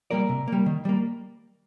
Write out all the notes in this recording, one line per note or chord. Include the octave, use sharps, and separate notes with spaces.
G3 A#3 A#4 D5
C3
G3 A#3
D#3
G3 A#3